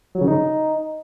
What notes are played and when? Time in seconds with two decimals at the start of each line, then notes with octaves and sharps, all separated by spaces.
0.15 F#3
0.21 C#3
0.28 D#4